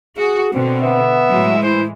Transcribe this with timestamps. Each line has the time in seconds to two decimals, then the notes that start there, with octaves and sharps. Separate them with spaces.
0.17 F#4 G#4
0.53 B2 D3 C4
0.82 B3 E5
1.30 A2 E3 F#3 G#3
1.63 E4 C5